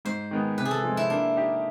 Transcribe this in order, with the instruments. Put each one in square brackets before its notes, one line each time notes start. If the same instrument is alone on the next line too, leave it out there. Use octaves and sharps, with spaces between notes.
[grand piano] G#2 [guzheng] C5
[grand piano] D#3 G#3 B3
[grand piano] C3 [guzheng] B4
[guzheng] G#4
A4
[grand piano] F3 G#3
[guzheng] E4
[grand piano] A#3 [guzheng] D4
[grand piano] D#4 G4